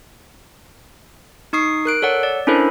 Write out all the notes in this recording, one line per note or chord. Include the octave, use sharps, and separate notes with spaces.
D#4 C#6 D#6 C7
A#4 F#6 D7
A4 C#5 D5 F#5
D5
C#4 D4 E4 A4 A#4 C5